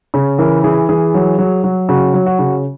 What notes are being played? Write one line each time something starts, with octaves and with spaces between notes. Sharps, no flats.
C#3
E3 A#4
E3 G#4
E3 G#4
F#3
F#3
F#3
C#3 F#4
F#3
F#4
C#3